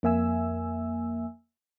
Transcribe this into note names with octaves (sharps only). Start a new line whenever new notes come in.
F2 A#3 E5 G#5 E6